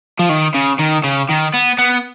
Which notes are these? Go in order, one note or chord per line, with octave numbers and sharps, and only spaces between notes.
F3
D#3
C#3
D#3
C#3
D#3
B3
B3